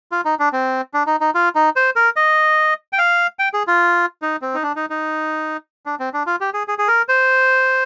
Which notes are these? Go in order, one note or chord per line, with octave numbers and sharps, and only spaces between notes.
F4
D#4
D4
C4
D4
D#4
D#4
F4
D#4
C5
A#4
D#5
G5
F5
G5
G#4
F4
D#4
C4
D#4
D4
D#4
D#4
D4
C4
D4
F4
G4
G#4
G#4
G#4
A#4
C5